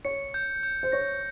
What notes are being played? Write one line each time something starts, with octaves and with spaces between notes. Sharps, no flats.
C#5 C#7
G6
G6
C5
C#5 A#6